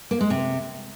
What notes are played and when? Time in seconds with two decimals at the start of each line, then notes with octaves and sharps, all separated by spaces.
0.11 A#3
0.21 G#3
0.30 C3